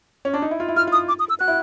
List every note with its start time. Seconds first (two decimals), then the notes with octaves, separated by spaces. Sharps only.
0.25 C#4
0.34 D4
0.42 D#4
0.51 E4
0.60 F4
0.68 E4
0.76 F4 F6
0.87 F4 D#6
1.08 D6
1.19 D#6
1.29 E6
1.40 F#4 F#6
1.48 E4